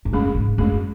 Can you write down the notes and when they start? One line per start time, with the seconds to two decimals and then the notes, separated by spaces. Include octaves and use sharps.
0.05 G#2
0.13 F#2 G#3 C#4 G#4
0.35 G#2
0.58 F#2 G#3 C#4 G#4